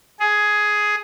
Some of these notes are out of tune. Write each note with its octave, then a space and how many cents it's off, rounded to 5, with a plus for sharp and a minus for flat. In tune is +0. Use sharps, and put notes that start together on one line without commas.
G#4 +10